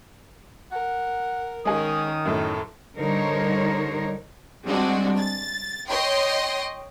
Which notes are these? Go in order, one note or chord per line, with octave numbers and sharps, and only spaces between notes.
A#4 F#5
D#3 G#3 C#4 G#4 A#4 D#6
F#2 A2 A4
D3 G3 D#4 A#4 C5 C#5
G3 G#3 C4 D4 F#4
A6
C#5 D#5 G5 C6